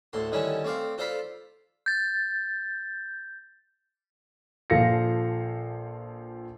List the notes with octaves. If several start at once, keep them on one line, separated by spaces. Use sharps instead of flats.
D2 A2 A4 C6
D3 D#3 G3 C#4 E4 A4
A3 C4 D5 F5
F4 A4 C5 D5 F5 B5
G6 A6
A#1 F3 A4 F5 A#6 C#7